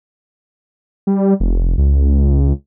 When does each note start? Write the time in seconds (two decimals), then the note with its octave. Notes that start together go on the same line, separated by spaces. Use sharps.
1.07 G3
1.40 F1
1.78 C#2